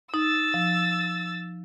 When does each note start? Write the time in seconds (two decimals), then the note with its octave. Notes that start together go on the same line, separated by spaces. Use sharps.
0.14 D#4 E6 A6
0.54 F3